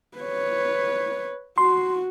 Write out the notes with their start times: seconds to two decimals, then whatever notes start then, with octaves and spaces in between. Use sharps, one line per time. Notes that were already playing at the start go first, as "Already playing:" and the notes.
0.18 B4 C#5
1.58 F#4 C6